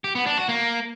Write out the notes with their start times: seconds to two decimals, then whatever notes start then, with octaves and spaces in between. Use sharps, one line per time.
0.04 G4
0.15 B3
0.26 D4
0.37 F#4
0.49 A#3